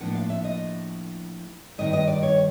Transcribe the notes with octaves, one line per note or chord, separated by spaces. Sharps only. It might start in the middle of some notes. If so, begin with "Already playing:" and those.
A2 F3 A#3 D4 F#5
F5
E5
D#5
G2 D#3 G3 D#5
D#5
D5
C#5